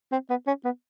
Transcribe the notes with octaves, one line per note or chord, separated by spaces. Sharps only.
C4
B3
C#4
B3